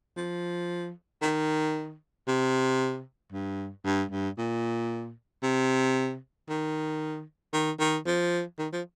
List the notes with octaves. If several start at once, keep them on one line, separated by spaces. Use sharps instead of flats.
F3
D#3
C3
G2
G2
G2
A#2
C3
D#3
D#3
D#3
F3
D#3
F3